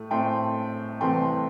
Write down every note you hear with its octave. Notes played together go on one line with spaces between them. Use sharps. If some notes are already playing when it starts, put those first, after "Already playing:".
Already playing: A2 A3
A2 A3 C4 G5 C6
C2 C3 E3 A3 G5 C6